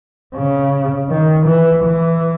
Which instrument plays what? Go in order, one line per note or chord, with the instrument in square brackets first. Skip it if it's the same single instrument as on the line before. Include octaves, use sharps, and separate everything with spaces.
[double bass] C#3
D#3
E3
E3